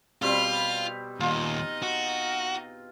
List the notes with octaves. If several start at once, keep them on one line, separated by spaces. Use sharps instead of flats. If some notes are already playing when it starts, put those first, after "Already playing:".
B2 G3 C4 F4 F6
D#2 A#2 D#4 F4 D#5
F#4